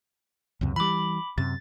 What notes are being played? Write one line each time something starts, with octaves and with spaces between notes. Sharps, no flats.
C#2 F#2 C3
E3 G3 B5 D6
F#2 C3 A6